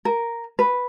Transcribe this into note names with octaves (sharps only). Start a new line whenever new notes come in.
A#4
B4